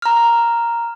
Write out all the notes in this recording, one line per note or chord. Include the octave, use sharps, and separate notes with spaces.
A#5 F6